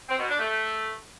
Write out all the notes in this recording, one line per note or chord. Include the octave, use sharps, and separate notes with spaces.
C4
B2
D4
A3